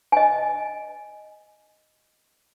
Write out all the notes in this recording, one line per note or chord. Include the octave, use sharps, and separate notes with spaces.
D#5 G#5